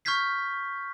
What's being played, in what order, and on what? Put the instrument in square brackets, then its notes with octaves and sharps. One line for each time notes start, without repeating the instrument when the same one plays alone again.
[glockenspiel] C#6 F6 G6 G#6 B6 C7